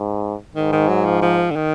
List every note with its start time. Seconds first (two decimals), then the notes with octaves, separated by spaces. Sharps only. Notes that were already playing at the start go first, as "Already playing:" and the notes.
Already playing: G#2
0.55 G#2 D#3
0.72 D#3
0.89 F#3
1.05 F3
1.22 F3
1.51 D3
1.56 D#3